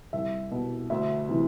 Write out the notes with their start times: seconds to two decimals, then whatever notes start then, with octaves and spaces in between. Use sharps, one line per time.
0.13 C2 E5
0.51 B2
0.90 D2 E5
1.29 C3 E3